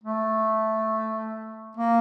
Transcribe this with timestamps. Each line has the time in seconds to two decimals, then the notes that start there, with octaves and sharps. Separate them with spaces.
0.04 A3
1.77 A#3